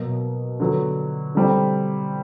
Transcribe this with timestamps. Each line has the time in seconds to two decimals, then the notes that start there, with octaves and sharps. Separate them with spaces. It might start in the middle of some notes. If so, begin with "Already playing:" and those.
Already playing: B2 F#3 A#3
0.60 D3 F#3 B3
1.35 D3 G3 C4